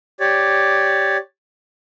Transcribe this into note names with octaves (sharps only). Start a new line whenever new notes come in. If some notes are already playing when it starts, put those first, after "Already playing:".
G4 C#5 D5